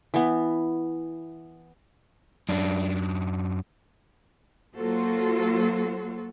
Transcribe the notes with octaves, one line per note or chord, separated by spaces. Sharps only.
E3 B3
F#2 D4
F#3 A#3 F4 F#4 A4 C5